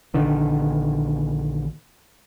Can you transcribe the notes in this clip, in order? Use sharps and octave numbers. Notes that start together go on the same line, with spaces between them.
A#1 D3 D#3